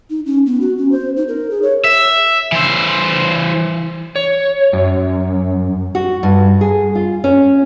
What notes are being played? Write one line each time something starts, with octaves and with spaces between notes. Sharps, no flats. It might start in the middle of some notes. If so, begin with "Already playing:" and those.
D#4
C#4
B3
F#4
C#4
C5
D#4
A#4
G#4
C#5
E5
E3 C5
C#5
F#2
F#4
G2
G#4
F4
C#4